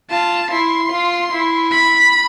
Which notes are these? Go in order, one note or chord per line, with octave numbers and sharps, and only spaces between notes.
F4 A5
E4 C6
F4
E4
B5